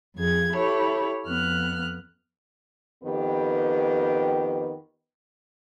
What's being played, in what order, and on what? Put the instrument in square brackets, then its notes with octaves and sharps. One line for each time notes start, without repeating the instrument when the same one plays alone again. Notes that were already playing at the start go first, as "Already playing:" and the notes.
[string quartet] F2 G#4 G#6
E4 G4 A4 C#5
F2 B3 F6 F#6
[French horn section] F2 D#3 B3 G4 B4